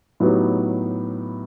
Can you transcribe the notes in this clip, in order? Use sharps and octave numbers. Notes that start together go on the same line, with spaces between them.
A2 F#3 B3 D#4 G4